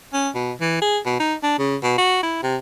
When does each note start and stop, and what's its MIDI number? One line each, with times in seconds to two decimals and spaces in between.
0.13 0.29 61
0.35 0.53 47
0.61 0.80 52
0.82 0.99 68
1.06 1.19 47
1.20 1.35 63
1.43 1.57 62
1.59 1.76 49
1.83 1.93 47
1.98 2.21 66
2.23 2.39 64
2.43 2.56 48